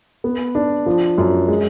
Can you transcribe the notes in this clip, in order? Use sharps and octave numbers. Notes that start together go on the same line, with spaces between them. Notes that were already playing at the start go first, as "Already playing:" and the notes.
B3
D4
F3
F#2
G#3